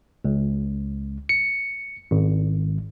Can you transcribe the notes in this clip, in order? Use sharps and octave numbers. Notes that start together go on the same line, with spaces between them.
C#2
C#7
G#1